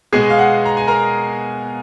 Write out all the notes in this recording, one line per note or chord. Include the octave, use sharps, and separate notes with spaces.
B2 G#3 G#4 G#5
F5
F#5
A#5
G#5
A#4 A#5